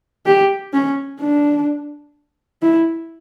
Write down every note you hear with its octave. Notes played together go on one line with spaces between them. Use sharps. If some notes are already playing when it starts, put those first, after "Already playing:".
G4
C#4
D4
E4